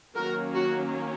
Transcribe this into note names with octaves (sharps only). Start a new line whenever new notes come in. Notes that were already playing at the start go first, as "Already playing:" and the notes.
D#3 F#3 A#3 C#4 F#4 A#4
F#4